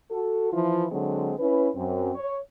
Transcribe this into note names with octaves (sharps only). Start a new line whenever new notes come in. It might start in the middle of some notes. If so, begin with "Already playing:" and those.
F#4 A4
E3 F3 E4 F4
D3 F#3 G#3 C4
C#4 E4 B4
F#2 C4
C#5